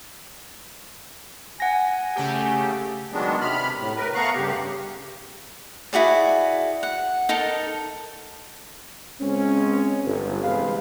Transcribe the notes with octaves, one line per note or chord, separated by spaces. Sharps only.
F#5 G#5 A#6
C#3 A3 G4
D#3 F#3 G#3 B3 D4
C3 B5 F6
A2
A#4 B4
A3 B3 F5 A#5 C#6 F#6
G2 C#3 G4
E4 F#4 G#4 D5
F#5
D#4 A4 A#4 A5
C#2 G#3 C4 C#4
G1
G1 E2 C3 G#3 B4 F5